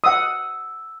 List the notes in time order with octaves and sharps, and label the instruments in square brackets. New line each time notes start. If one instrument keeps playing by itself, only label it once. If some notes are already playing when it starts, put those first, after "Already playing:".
[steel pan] F#5 D#6 [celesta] E6